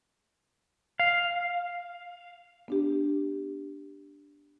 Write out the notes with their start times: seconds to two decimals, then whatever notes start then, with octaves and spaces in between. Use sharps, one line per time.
1.00 F5
2.68 B3 D4 G4